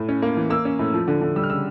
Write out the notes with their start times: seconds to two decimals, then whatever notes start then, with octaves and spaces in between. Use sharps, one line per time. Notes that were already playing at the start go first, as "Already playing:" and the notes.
Already playing: A2
0.09 C#4
0.22 A#3
0.37 E3
0.50 A#3 E6
0.65 C#4
0.79 A2
0.94 F3
1.08 D3
1.21 D3
1.36 G3 E6
1.43 F6
1.50 C#3 E6